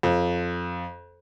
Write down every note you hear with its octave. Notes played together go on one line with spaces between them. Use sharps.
F2